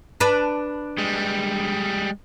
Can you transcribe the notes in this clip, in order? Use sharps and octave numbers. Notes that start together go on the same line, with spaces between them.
D4 B4 D5
G3 G#3